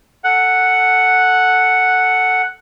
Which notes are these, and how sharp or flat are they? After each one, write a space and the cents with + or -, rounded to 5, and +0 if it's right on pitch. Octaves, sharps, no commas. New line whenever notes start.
A4 +0 F#5 +0